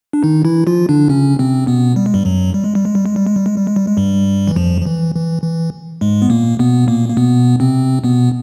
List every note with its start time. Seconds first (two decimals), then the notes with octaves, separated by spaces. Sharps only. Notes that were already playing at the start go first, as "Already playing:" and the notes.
0.13 D4
0.23 D#3 D#4
0.45 E3 E4
0.67 F3 F4
0.89 D3 D4
1.09 C#3 C#4
1.39 C3 C4
1.67 B2 B3
1.96 G3
2.06 G#3
2.14 G2 G3
2.25 F#2 F#3
2.54 G3
2.64 G#3
2.75 G3
2.85 G#3
2.95 G3
3.06 G#3
3.16 G3
3.27 G#3
3.36 G3
3.46 G#3
3.57 G3
3.67 G#3
3.76 G3
3.87 G#3
3.97 G2 G3
4.48 E3
4.56 F2 F3
4.81 F3
4.86 E3
5.15 E3
5.43 E3
6.01 G#2 G#3
6.22 B3
6.30 A#2 A#3
6.59 B2 B3
6.88 A#2 A#3
7.09 A#3
7.17 B2 B3
7.60 C3 C4
8.04 B2 B3